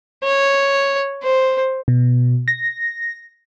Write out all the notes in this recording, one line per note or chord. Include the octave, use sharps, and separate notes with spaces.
C#5
C5
B2
A#6